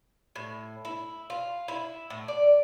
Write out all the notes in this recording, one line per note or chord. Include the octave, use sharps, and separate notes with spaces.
A2
E4
F4
E4
A2
D5